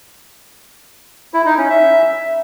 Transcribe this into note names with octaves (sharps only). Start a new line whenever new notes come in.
E4
D#4
C#4
E5